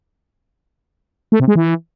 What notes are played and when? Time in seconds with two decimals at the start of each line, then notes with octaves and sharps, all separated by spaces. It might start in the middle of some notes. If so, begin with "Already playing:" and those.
1.32 A3
1.40 C3
1.48 G#3
1.56 E3